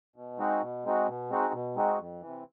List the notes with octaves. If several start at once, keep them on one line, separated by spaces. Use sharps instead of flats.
B2
G#3 C4 D#4 F#4
B2
G#3 C4 D#4 F#4
B2
G#3 C4 D#4 F#4
B2
G#3 C4 D#4 F#4
F2
C3 E3